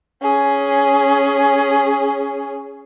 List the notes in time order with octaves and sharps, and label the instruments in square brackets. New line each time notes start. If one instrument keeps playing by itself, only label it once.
[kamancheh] C#4 G#4